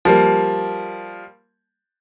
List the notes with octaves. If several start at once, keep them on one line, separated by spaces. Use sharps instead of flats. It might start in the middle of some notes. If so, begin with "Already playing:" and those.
F3 G3 A#3